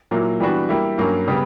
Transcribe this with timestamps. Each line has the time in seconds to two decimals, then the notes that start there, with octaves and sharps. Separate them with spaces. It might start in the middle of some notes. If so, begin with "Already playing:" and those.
0.11 A#2 F#3 A#3 E4
0.40 E3 G3 B3 D4 F#4
0.69 G3 A#3 E4
0.98 G2 F#3 A#3 C#4
1.28 C#3 G3 B3